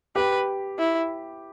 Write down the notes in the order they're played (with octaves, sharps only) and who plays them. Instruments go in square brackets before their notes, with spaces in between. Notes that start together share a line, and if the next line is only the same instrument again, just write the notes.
[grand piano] G4 [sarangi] B4
[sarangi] E4